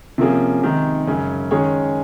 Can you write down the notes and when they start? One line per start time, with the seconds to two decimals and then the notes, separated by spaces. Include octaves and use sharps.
0.18 C3 F3 A#3 C#4 G#4
0.63 C3 D#3 G#3 D#4
1.07 F#2 C#3 G#3 C#4
1.51 D#3 G#3 C#4 G#4 C#5